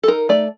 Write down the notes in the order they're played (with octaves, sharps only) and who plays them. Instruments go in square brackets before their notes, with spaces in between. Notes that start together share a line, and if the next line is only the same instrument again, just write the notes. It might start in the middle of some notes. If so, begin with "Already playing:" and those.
[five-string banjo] A4
D#4 A#4
A3 D5